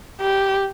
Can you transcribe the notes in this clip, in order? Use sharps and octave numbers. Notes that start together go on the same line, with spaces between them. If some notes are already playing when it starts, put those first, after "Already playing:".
G4